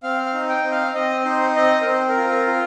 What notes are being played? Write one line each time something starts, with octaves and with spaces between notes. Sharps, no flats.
C4 F5
F5
D#4
G5
C4
F5
C4 D#5
D#4 C5
C4 D#5
A#4
C4 C5
A#4
F4
A#4
F4